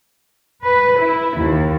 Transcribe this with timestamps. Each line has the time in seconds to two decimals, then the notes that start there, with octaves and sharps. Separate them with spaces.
0.62 B4
0.97 E4
1.36 D#2